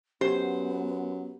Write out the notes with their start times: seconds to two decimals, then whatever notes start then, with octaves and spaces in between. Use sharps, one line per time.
0.21 F#2 B3 G4 C5